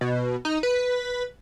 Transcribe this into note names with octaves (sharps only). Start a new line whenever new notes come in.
B2
D#4
B4